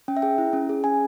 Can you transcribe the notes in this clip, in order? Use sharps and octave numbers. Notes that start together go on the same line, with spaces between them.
C#4 G5
E5
G#4 G5
E4
C#4
G#4
C#4 G#5